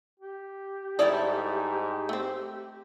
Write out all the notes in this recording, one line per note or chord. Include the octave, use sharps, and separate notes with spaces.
G4
G#2 G3 E4 G#4 A4 C#5 D5
A3 C4